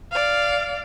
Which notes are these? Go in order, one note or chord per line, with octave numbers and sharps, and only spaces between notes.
D5 F5